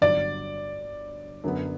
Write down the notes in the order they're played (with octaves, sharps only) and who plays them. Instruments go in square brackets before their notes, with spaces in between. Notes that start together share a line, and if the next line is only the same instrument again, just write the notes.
[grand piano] G1 G2 F#3 [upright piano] D5
[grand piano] F#2 D3 F#3 B3